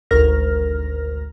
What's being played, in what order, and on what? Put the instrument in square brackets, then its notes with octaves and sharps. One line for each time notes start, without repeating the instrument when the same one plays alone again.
[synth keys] G#1 D2 A#4 F6 A#6